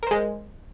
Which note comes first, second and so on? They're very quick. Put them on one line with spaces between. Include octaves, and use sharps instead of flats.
A#4 C5 G#3